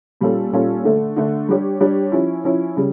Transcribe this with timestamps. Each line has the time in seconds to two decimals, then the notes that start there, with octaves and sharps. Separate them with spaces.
0.21 A#2 G3 C#4 F4 A4
0.53 A#2 G3 C#4 F4 A4
0.84 D3 A3 D4
1.16 D3 A3 D4
1.49 G3 D4 G4 C#5
1.80 G3 D4 G4 C#5
2.12 F3 C#4 E4
2.44 F3 C#4 E4
2.77 C#3 G3